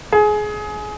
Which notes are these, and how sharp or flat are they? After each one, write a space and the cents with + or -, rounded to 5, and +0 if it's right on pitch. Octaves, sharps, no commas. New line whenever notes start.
G#4 +20